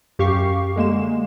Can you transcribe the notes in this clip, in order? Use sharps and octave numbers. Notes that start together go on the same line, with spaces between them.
F#2 G4 F5 C#6 C7
D3 G#3 A#3 E7